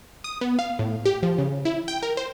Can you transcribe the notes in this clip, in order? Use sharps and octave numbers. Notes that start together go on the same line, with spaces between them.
D#6
B3
F5
A2
G4
F3
C#3
E4
G5
A#4
C5